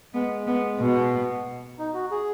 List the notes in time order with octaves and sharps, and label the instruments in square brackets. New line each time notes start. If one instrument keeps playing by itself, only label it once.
[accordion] G#3 [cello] B3
[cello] B3
B2
[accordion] D#4
F#4
G#4